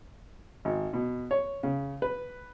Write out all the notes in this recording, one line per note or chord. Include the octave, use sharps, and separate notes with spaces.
G#1
B2
C#5
C#3
B4